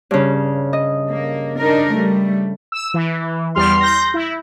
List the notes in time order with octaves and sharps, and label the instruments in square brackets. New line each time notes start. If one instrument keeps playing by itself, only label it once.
[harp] G2 C#3
D#5
[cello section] A#3
D4 D#4 A#4
G3 A3
[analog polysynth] E6
E3
[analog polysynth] E2 G3 F6 [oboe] C6
[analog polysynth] G6 A#6
E4